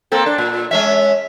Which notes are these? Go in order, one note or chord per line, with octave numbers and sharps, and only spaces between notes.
A#3 C4 A4
D4
A#2
G#3 C#4 E5